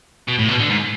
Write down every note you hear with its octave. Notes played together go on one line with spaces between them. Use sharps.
B2
A2
B2
D3
G#2